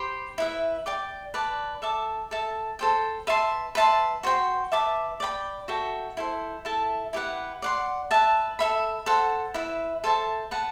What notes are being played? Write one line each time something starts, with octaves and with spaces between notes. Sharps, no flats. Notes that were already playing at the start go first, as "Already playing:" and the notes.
Already playing: G4 C5 G5 B5
E4 B4 E5
D5 G5 D6
B4 D5 A5
A4 E5 A5 D6
A4 E5 A5
A4 C5 G5
B4 E5 A5 C6
B4 E5 A5 C6
F#4 C5 G5 C6
B4 E5 A5 D6
D5 G5 B5
F#4 A4 E5 G5
E4 A4 C5
E4 A4 E5 A5
E4 G4 B4 F#5
D5 F#5 C6
B4 E5 A5
A4 E5 B5
A4 C5 F#5
E4 B4 E5
A4 C5 E5 A5
B4 F#5 A5